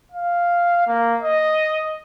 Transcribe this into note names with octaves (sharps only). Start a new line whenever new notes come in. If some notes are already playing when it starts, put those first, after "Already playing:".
F5
A#3
D#5